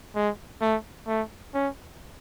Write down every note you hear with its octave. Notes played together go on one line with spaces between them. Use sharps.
G#3
A3
A3
C#4